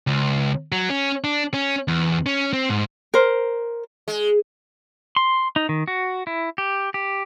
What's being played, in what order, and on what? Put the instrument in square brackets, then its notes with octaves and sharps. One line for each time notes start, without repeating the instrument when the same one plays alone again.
[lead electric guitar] C#2
F#3
C#4
D4
C#4
E2
C#4
C4
G#2
[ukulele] A#4 C5
[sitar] G#3
[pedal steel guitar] C6
D#4
D#3
F#4
E4
G4
G4